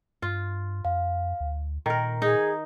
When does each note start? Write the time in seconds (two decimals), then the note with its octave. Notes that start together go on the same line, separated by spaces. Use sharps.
0.22 G2 F4
0.85 F2 F5
1.40 D2
1.86 A#2 D#3 A#4 A#5
2.22 D#4 G#4